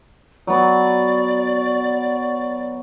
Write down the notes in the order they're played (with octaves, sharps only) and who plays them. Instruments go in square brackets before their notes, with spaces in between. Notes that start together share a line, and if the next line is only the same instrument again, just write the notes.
[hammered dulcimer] F#3 B3 [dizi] D5